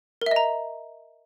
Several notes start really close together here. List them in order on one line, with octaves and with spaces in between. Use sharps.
A#4 E5 D#5 A#5